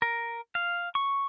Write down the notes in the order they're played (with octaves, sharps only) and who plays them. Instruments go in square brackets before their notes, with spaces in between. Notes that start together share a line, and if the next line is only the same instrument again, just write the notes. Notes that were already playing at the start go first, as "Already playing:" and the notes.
[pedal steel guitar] A#4
F5
C#6